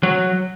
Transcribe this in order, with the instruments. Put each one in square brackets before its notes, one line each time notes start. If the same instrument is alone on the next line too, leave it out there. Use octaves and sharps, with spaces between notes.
[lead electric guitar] F#3